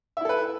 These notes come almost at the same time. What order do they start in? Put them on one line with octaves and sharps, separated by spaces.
E5 E4 A4 B4